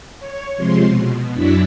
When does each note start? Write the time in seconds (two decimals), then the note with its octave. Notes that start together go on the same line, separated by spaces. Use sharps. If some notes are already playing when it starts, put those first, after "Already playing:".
0.19 C#5
0.56 C3 F3 G#3 C6
0.86 B2
1.34 F#2 F#3 D4 E4 B6